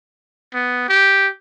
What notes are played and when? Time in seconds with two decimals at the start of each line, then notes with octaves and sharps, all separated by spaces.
0.54 B3
0.89 G4